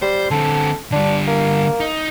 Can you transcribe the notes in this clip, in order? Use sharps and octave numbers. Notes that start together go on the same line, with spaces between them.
G3 C5
D3 C4 A4
D3 G3 D4
A#3
D#4